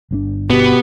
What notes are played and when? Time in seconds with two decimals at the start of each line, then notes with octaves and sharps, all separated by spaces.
0.11 G1 C3 D4
0.50 B2 B3 G4